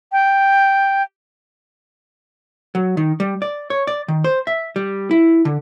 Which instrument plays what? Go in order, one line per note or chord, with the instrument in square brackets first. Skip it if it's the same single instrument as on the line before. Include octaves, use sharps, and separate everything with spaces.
[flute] G5
[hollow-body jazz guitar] F#3
D#3
G3
D5
C#5
D5
D#3
C5
E5
G3
E4
D3